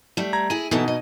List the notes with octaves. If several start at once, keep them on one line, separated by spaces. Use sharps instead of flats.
G3 A3
A#5 G#6 A#6
E4 G#4 D#7
B2 E3 B3 D#4 A4
D#5